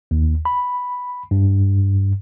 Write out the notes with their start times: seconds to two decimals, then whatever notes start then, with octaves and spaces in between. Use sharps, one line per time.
0.11 D#2
0.45 B5
1.31 G2